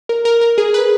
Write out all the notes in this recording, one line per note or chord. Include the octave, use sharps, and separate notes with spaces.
A#4
A#4
A#4
G#4
B4